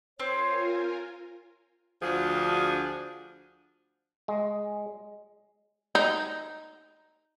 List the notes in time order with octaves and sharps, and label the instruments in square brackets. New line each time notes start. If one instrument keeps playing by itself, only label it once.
[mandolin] C4 [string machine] F4 A#4 G#5 [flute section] C5 C#5
[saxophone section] D2 F3 D4 F#4 G#4
[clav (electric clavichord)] G#3
[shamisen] D#4